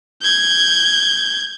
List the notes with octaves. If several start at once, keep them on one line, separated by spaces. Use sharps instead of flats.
G6 G#6